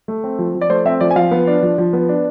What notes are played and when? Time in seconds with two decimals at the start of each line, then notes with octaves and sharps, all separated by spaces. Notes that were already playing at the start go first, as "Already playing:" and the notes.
0.08 A3
0.24 C4
0.39 F3
0.55 F3
0.61 D5
0.69 A3 C5
0.85 C4 E5
1.01 F3 D5
1.11 G#5
1.16 F3 F5
1.31 B3
1.47 D4
1.63 F3
1.78 F3
1.93 B3
2.09 D4